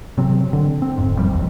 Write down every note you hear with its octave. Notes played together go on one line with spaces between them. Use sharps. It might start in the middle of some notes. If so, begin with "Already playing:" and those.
C3 F#3 C4
D3
C4
D1 F2 G#2
E2 F3 G3
F1 A#1 D#2